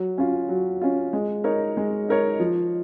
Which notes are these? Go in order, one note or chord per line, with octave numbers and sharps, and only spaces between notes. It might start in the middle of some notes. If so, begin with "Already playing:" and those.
Already playing: F#3
C#4 F4
F#3
C#4 F4
G#3
D#4 A#4 C#5
G#3
D#4 A#4 C#5
F3